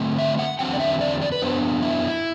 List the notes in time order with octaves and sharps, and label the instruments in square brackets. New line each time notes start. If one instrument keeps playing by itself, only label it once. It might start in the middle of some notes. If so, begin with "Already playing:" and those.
Already playing: [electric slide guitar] D3 A3 C4
E5
F#5
E2 D3 F#3 C4 G5
D5
E5
D5
D5
B4
F#2 F#3 B3 D4 C5
E4